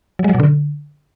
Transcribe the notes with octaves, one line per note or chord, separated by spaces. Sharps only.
F#3
G#3
F#3
B2
D3